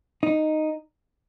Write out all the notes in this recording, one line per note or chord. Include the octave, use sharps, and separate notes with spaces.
D#4